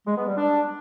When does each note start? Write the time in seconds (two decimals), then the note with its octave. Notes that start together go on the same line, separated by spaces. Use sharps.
0.06 G#3
0.16 B3
0.27 G3
0.37 D4